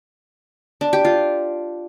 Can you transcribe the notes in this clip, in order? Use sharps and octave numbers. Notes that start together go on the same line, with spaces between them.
D4
G4
F4